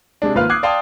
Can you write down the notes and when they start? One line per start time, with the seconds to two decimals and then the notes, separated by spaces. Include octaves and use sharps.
0.22 C3 G#3 D4
0.35 G#1 A#3 F4 B4 F5 F6
0.50 D6 D#6 F#6 G#6 C7
0.63 D5 F5 G5 A5 C6 D#6